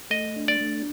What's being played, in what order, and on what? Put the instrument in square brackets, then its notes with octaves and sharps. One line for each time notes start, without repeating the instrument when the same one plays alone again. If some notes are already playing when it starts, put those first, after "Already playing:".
[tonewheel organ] A3 [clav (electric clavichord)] D#5
[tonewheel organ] D4
[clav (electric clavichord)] D5
[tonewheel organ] A3